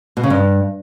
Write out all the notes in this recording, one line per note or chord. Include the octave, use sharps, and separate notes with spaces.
B2
C#3
G2